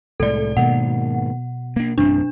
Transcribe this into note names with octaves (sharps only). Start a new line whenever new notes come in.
C2 A2 G#3 A4 D5
G#2 B2 D#3 A#3 F#5
A#3 D4
A1 F#2 C4 D4